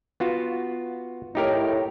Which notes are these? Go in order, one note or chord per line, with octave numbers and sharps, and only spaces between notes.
B3 F4 F#4
A2 D#4 G4 A#4